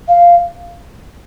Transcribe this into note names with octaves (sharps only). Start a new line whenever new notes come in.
F5